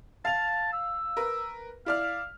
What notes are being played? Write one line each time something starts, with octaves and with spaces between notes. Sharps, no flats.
F5 A5 F7
E6
A#4 B4
E4 D5 F5 F6